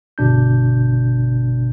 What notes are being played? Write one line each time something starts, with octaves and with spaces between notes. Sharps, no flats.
G1 B2 D4 G6